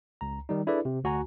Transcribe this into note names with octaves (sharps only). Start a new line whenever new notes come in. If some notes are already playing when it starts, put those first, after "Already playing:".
C#2 A#5
D#3 G3 D#4
D4 E4 G#4 A4 B4 D5
C3
D2 F#4 G#5 A#5